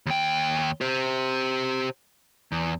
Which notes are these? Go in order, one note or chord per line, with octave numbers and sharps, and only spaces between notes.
D#2 G5
G4 C5
E2